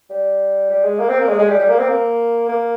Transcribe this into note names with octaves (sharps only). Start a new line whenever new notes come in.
G3
G3
G#3
A#3
C4
A#3
G#3
G#3
G3
G3
A#3
C4
A#3
A#3